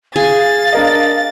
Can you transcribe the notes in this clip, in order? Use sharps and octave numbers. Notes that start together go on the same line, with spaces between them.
G#4 F5 A6
D4 A#4 D#5